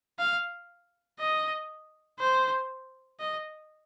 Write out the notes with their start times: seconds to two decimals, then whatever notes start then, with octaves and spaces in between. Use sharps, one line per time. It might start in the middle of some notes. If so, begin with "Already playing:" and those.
0.19 F5
1.20 D#5
2.19 C5
3.20 D#5